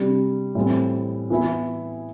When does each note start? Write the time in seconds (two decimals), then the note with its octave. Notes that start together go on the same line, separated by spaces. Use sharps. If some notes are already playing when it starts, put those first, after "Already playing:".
Already playing: C3 G3 D4
0.55 A2 E3 G3 C4
1.30 E3 B3 E4